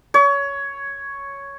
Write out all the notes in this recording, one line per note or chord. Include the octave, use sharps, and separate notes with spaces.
C#5